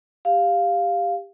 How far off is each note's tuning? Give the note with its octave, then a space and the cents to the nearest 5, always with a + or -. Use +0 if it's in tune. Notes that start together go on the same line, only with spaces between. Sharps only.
G4 +15 F5 +0